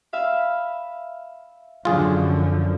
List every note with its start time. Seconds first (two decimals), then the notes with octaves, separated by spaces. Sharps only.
0.13 E5 F5 B5
1.85 F#2 D3 F3 F#3 D4 F4 F#4 G#4